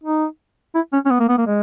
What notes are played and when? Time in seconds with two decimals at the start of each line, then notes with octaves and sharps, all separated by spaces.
0.04 D#4
0.75 E4
0.93 C#4
1.06 C#4
1.10 B3
1.20 A#3
1.29 B3
1.38 A#3
1.47 G#3